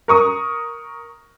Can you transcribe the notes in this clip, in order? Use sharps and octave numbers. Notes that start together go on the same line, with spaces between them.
A#4 C#6 D#6